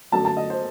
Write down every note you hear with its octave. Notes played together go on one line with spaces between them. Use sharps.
G1 F#2 F#3 A3 A5
A5
D#5
C5